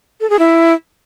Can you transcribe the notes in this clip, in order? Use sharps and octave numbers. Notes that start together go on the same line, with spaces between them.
A4
G#4
E4